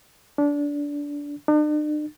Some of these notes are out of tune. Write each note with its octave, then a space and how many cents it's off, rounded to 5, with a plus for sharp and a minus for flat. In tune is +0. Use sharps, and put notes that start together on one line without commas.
D4 -20
D4 +45